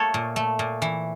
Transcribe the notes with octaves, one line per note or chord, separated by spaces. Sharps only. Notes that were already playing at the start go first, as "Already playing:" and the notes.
Already playing: A3 A#3 A4 C#5
A#2
A3
A#2
E3